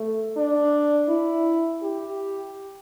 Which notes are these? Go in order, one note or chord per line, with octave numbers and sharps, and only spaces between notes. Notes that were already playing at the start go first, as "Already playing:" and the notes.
Already playing: A3
D4
E4
G4